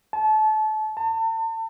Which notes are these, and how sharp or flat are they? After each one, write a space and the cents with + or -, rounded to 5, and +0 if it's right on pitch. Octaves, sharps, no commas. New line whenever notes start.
A5 -30
A5 +35